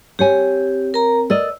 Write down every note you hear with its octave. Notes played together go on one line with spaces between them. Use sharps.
C4 G4 C#5 G#5
A#4 A#5
A#4 D5 D#5 E6